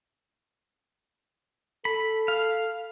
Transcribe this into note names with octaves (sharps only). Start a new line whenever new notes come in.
A4 B5
F5